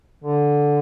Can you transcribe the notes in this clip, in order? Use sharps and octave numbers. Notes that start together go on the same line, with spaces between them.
D3